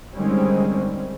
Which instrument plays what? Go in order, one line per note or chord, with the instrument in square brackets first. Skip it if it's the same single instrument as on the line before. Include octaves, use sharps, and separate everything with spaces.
[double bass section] D3 D#3 G3 G#3 C4 C#4